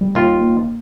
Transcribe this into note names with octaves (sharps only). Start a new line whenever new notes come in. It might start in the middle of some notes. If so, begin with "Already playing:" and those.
G3
D#2 F4
A#3